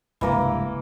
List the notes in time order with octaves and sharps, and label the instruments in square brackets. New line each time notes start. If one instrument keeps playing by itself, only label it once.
[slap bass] F1 C#2 G2 [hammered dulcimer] E3 A#3 D6